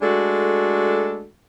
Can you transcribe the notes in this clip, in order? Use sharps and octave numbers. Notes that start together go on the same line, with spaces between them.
G#3 A3 D4 F#4 A4